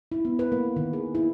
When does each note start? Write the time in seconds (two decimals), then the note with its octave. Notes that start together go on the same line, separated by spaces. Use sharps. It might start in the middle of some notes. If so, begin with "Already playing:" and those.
0.12 E4
0.25 B3
0.39 B4
0.52 A#3
0.76 D#3
0.93 G#4
1.15 E4